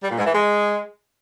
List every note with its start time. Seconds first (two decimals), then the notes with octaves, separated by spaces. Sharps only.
0.03 G3
0.10 A#2
0.18 G#2
0.26 E3
0.33 G#3